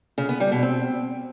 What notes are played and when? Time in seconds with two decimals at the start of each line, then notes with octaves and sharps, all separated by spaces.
0.18 C#3
0.29 B3
0.40 G3
0.51 B2
0.63 C4